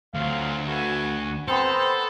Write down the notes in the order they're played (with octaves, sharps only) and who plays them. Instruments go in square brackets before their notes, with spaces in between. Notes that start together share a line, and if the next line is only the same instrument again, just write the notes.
[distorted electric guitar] D2 [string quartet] F#3 C4 F4 [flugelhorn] F5
[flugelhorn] F#4 [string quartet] A4 B4 G#5
[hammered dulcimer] B3 C4 [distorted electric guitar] A4 [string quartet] B4 A#5 E6 [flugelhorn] C5